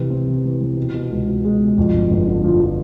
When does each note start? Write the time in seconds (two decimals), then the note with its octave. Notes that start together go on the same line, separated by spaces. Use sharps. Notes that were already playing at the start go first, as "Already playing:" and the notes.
Already playing: C3 E3
0.10 C4
0.28 E3
0.45 E3
0.61 E3
0.77 B2
0.94 B2
1.11 C#2
1.28 B2
1.44 G#3
1.60 B2
1.78 F2
1.93 G1
2.10 G1
2.27 D3
2.44 F3
2.61 F3